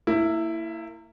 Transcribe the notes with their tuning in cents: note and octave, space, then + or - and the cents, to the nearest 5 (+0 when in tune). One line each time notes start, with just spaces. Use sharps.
A#3 -35 E4 +0